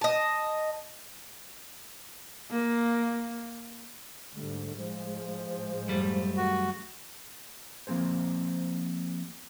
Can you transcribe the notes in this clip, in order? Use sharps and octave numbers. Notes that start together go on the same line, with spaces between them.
D#5 A5
A#3
G#2 D3 G3 A3
A2 F3 G#3
F#2 G3 A3
D#3 F#4
F3 A#3 C4 G#4 C5